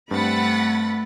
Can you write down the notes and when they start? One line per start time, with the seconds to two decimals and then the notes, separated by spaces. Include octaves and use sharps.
0.11 G2 A3 C4 F#5 B5 A6